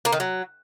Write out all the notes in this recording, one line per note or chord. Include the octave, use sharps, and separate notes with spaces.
A#3
D#3
F#3